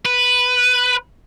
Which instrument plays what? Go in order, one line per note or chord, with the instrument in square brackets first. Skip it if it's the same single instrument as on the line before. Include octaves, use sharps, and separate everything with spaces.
[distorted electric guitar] B4